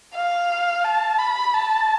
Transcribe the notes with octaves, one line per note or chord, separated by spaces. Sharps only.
F5
A5
B5
A5